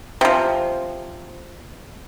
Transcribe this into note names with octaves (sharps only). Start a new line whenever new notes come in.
C3 F3